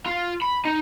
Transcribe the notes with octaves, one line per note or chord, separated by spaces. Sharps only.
F4
B5
D#4